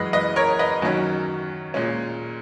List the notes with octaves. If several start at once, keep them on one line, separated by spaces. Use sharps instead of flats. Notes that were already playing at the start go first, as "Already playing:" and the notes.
Already playing: F#2 E3 G#3 B4 D#5
B4 D#5
A#4 C#5
B4 D#5
F#2 D#3 F#3 C#4
A#2 G#3 C#4